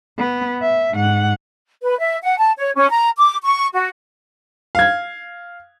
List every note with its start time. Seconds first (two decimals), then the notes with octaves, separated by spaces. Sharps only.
0.18 B3
0.62 E5
0.93 G#2 F#5
1.83 B4
1.98 E5
2.23 F#5
2.38 A5
2.58 C#5
2.76 C#4
2.90 A#5
3.18 D6
3.44 C#6
3.73 F#4
4.75 F5 G#6